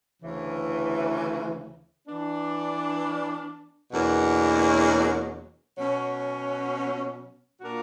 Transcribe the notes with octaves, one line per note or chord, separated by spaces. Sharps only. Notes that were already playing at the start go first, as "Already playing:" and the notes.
D2 C#3 E3
E3 B3 D4
E2 B2 F#3 A#3 D4
B2 F#3 C#4
A#2 A#3 D4 F#4 A#4